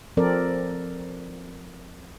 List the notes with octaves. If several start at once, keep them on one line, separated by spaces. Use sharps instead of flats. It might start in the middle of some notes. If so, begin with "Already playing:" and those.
F3 C4 A4 A#4 D5